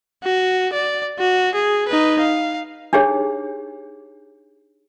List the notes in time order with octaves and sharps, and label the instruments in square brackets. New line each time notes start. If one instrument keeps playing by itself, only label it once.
[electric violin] F#4
D5
F#4
G#4
D#4 B4
F5
[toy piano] D4 D#4 G4 G#4 C#5